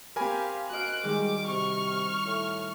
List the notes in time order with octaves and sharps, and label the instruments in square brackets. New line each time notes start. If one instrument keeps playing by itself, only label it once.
[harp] C4 D6 [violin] G4 F5 [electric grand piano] A#4 G#5 B5
[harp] F#4 D#5 F5 [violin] F#6 D7
[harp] D#3 G3 [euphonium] G#3 [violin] D6
[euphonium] C3 [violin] C#6 F6
[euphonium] A2